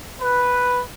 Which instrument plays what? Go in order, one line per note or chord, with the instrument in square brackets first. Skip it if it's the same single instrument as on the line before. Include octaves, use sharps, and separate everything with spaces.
[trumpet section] B4